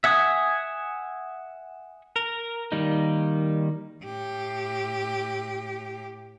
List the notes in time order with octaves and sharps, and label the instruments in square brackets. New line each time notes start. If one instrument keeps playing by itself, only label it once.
[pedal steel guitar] E5 F#5 G#5 D#6
A#4
D#3 G3 A#3 D#4
[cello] A2 G4